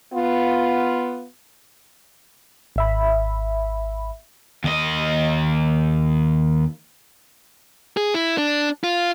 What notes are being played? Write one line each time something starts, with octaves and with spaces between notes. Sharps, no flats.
B3 F4
G#1 E5 B5
D#2 D#5
G#4
E4
D4
F4